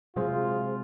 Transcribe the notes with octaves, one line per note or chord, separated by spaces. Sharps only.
C3 F#3 G#3 F4 G#4 C5